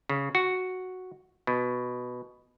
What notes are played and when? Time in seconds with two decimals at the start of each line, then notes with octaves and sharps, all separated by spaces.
0.09 C#3
0.35 F#4
1.47 B2